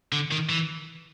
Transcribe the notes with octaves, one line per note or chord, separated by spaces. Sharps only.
D3
D#3
E3